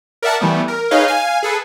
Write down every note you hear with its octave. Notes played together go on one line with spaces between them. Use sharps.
A#4 D5 E5 F#5 A5
E3 G3 A3 B3
A#4
D#4 G#4 B4 C#5 D#5 F5
F5 G#5
G#4 A4 B4